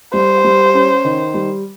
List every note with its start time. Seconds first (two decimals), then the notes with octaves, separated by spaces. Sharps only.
0.14 G3 C5
0.44 G3
0.74 C#4
1.05 D#3
1.34 G3